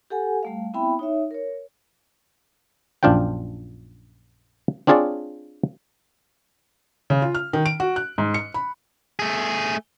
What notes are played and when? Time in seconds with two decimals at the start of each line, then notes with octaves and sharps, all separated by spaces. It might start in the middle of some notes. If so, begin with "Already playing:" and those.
0.10 G4 A4 F#5 G#5
0.43 G3 A3 F5
0.74 B3 C4 E4 E5 G5 B5
0.99 D#4 C#5 E5
1.31 A#4 C#5
3.03 A#1 F#2 D4 F4 C5 G5
4.87 C4 D4 F4 G#4 C#5 D5
7.10 C#3
7.22 F4
7.35 F6
7.53 D#3
7.66 D7
7.80 F#4
7.96 F#6
8.18 G#2
8.34 C#7
8.54 B5
9.19 A3 G#4